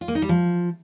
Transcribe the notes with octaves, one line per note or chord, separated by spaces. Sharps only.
F4
A#3
D#4
G3
F3